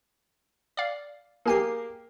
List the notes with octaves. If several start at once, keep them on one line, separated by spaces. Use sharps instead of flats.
D5 F5
A#3 G4 G#4 A#4 G#5 C7